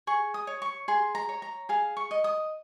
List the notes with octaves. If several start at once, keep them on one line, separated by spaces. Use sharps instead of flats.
G#4 C#6
D#6
C#5
C#6
G#4 C6
A#5
C#5
A#5
G#4 F5
C#6
D#5
D#6